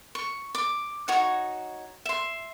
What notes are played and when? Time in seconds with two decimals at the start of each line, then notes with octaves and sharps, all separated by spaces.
0.15 C#6
0.55 D6
1.08 D#4 F#4 C#5
2.06 E5 C6